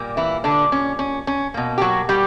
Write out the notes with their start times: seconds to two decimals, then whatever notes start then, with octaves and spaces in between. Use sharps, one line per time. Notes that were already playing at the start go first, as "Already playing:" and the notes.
Already playing: A#2 G3 A#3
0.17 E3 E4
0.44 D3 D4
0.72 C#4
0.99 C#4
1.27 C#4
1.54 B2 A#3
1.78 G4
1.81 F#3 F#4
2.09 G3 G4